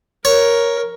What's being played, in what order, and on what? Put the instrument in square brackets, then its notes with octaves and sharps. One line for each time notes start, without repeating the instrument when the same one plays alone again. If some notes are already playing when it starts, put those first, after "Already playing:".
[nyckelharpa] A#4 [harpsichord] C#5